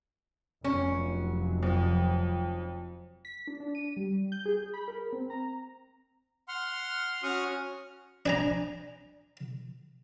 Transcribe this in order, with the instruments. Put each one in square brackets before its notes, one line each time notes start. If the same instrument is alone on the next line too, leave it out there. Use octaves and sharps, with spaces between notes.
[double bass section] F1 F#3 [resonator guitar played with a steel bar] C#4
[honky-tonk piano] F2
[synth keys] B6
D4
D4
D#7
G3
G6
G#4
B5
A#4
C4
A#5
[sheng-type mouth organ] F#5 C6 F6
C#4 F#4 F#5 C#6 D#6 F6
[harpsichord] D4 G#5 A#5